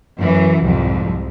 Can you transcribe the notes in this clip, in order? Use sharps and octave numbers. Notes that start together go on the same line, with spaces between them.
F#2 E3
C2 F2 G#2